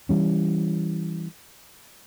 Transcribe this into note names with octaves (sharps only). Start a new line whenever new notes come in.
E3 G3 C#4